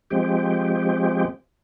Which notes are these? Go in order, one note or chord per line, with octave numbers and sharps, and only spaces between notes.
F3 G#3 C4 G4